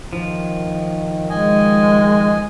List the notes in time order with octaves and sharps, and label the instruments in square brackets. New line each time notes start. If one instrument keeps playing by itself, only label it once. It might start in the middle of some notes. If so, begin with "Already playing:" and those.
[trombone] D#3 [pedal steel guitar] F3
[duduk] G#3 [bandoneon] D#5 G#5